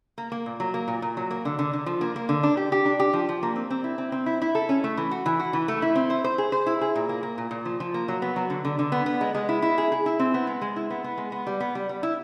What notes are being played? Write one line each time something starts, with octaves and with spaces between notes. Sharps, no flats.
A#3
A#3
A#2
F#3
A#3
A#2
A#2
F#3
A#3
D3
D3
D3
F3
A#3
A#3
D3
D4
G4
G4
D4
G4
F3
F3
A#3
C4
C4
E4
C4
C4
E4
E4
A4
C#4
A3
E3
F#4
E3
F#4
E3
A3
E4
C4
C5
C5
G#4
C5
E4
G#4
A#2
A#3
A#3
A#2
A#2
F3
F3
A#3
F#3
B3
F#3
D3
D3
D3
B3
B3
G#3
G#3
E4
E4
G#4
G#4
E4
C4
B3
G#3
G#3
E4
B3
B3
G#3
B3
G3
B3
G3
G3
E4